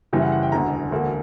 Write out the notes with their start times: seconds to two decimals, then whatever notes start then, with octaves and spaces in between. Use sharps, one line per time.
0.13 F#1 F#2 C#3 E3 G3
0.22 F#5
0.32 F#5
0.43 G5
0.52 E1 D2 D3 A#5
0.91 E1 D2 D3 A#3